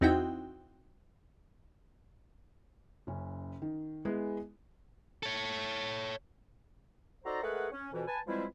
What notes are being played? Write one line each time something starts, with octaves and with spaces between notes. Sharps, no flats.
E2 C4 D#4 E4 F#4 G5
F#1 C#4
D#3
G#3 B3 E4 G#4
A4 C#5
D#4 F#4 A4 C5 D5 A#5
G#3 A3 G#4 A#4 B4 F#5
C#4
F2 B2 E3
B4 G#5 A5
E3 F3 G3 G#3 C4 E4